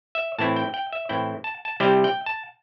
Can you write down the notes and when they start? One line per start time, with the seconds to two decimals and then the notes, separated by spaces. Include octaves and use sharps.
0.15 E5
0.38 A2 E3 C4 E4 A5
0.56 G5
0.74 G5
0.93 E5
1.09 A2 E3 C4 E4 G5
1.44 A5
1.65 A5
1.80 C3 G3 C4 E4 G5
2.04 G5
2.26 A5